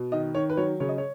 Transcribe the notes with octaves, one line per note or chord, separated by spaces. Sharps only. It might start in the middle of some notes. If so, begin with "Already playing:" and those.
Already playing: B2
D#3 D#5
D#3 C#5
B4
F#3 C#5
C#3 C#5
D#5
C#5